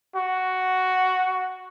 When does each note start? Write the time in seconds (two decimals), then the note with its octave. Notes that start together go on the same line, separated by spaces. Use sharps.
0.16 F#4